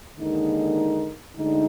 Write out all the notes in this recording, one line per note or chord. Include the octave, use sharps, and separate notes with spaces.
D#2 D3 G#3 D#4 A#4
D2 D3 G#3 D#4